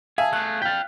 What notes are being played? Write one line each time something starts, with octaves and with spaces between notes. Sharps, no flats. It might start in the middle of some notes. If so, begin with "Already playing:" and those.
G#4 E5 F5 G#5 A5
A3 G#4 F#6
F5 G5 A6 B6